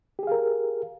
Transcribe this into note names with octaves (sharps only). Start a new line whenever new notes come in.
G4 G#4 A#4 F5